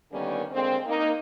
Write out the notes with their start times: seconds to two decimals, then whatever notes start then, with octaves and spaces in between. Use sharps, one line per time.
0.12 D3 D#3 G3 A#3 B3 C#4
0.52 D3 G#3 A#3 C4
0.86 A#3 D#4